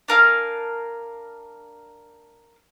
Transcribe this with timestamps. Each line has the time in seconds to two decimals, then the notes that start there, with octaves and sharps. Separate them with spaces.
0.08 D4 A#4 F5 G#5